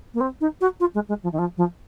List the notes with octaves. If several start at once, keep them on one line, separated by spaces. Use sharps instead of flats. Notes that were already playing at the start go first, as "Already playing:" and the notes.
A#3
C4
D#4
F#4
F4
G#3
G#3
F3
D#3
F3
F3